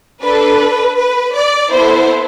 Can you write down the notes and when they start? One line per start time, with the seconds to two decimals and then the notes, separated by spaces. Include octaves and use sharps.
0.22 D4 A4 B4
0.98 B4
1.36 D5
1.73 B3 E4 A4 C5